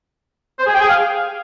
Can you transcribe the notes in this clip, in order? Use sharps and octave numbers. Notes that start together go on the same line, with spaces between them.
C5
G#4
G5
G#4
F5